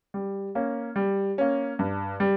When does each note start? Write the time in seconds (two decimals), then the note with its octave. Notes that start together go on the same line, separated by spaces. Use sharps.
0.14 G3
0.55 A#3 C#4
0.96 G3
1.38 A#3 C#4
1.79 G2
2.20 G3